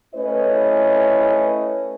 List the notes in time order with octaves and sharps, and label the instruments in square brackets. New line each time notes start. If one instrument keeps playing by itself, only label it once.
[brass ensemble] A3 C#4 E4 B4 C#5 D#5